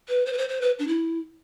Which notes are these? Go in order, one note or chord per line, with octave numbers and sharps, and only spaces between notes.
B4
C5
B4
C5
C5
B4
D4
E4